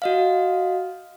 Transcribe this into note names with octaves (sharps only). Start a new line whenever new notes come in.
F#4 D#5 F5